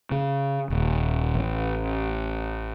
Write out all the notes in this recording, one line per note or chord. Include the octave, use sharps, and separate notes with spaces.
C#3
D#1
A1